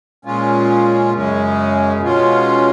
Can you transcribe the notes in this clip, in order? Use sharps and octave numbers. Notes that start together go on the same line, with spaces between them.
A#2 G#3 C#4 F4
F#2 C#3 G#3 C#4
B2 G#3 C#4 F4